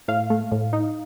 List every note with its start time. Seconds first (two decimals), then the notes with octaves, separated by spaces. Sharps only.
0.08 A2 F5
0.30 A3
0.52 A2
0.73 D#4